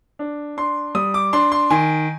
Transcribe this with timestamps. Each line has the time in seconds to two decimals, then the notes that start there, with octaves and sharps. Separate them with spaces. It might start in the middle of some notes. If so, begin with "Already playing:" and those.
0.19 D4
0.57 D4 C6
0.95 G3 D#6
1.14 D6
1.33 D4 C6
1.52 C6
1.70 D#3 G#5